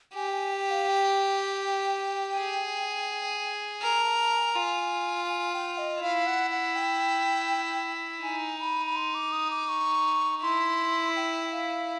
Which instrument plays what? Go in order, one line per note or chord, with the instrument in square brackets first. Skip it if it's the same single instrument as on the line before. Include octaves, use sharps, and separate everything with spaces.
[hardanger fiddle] G4 [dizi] G#5
[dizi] G5
G#5
G5
F5
G5
[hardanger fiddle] G#4
[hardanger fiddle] A#4 [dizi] G#5
[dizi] A5
A5
G#5
[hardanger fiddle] F4 [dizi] G#5
[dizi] G#5
G5
D#5
[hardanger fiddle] E4 [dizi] F5
[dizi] F#5
F#5
G5
[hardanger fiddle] D#4 [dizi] G#5
[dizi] B5
B5
C6
D6
D#6
D6
C#6
[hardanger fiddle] E4 [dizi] C6
[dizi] G5
F5